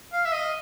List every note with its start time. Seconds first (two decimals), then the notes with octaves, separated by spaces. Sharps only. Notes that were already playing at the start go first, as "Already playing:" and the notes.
0.13 F5
0.25 E5
0.32 D#5